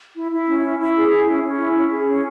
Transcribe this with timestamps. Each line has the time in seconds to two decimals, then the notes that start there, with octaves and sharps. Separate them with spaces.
0.15 E4
0.31 E4
0.46 C#4
0.63 E4
0.79 E4
0.95 G#4
1.11 E4
1.27 C#4
1.43 C#4
1.59 E4
1.76 C#4
1.91 G#4
2.07 C#4